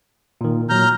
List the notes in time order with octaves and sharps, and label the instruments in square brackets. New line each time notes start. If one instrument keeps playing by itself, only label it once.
[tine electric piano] A#2 D#3
[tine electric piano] A#2 F#3 [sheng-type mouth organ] A#5 F6 G6